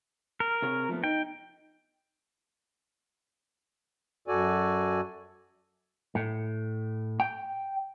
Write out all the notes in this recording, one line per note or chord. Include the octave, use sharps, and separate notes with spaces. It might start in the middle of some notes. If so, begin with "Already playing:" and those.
A#4
C3 G#4 C#5
F3 A3 B3
D#4 G5
F#2 F#4 A4 D5 G#5
A2
G5